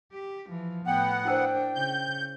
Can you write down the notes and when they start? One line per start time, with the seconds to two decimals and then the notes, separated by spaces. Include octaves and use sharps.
0.13 G4
0.50 E3 F3
0.87 A2 B3 F#5 G5
1.25 D4 E4 A#4 C5 G5
1.75 C#3 G6